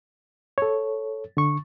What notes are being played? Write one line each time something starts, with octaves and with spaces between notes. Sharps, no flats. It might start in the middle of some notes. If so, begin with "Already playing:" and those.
A4 C#5
D3 C#6